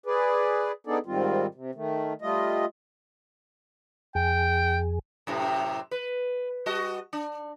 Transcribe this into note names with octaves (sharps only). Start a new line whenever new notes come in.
G#4 B4 D5
B3 D4 D#4 G#4 A4 D5
G#2 D#3 G3 C4 F4
C3
D#3 A3
G3 A3 F4 D#5
F2 G#4 G5
F#2 A2 C3
B4
G3 F#4 D#5
D4